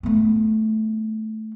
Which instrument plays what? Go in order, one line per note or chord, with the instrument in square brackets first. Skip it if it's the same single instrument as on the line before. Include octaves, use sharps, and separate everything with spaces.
[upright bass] A3 B3